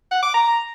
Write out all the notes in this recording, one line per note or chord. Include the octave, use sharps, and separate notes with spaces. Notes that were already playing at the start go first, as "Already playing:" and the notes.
F#5
D6
A#5